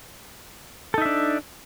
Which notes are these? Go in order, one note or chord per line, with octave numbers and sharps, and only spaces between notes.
D4 D#4 A4 E5